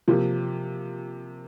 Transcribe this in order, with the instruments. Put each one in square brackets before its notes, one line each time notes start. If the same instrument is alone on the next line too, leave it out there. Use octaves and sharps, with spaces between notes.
[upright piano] C3 F3 A#3